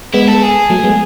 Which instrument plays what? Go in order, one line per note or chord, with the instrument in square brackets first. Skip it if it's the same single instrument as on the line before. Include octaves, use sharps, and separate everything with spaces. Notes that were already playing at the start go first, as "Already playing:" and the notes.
[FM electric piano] G#3 B3 [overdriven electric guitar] E4
[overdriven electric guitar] A4
G#4
[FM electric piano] F#3 A3
G#3 B3